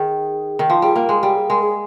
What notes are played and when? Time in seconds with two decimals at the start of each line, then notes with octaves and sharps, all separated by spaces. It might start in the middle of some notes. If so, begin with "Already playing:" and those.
Already playing: D#3 G#4
0.59 D#3
0.70 F3
0.82 G3 G#4
0.96 A#3 A#4
1.09 G#3 G#4
1.23 G3 G4
1.36 G#4
1.49 G#3 A#4
1.63 G#4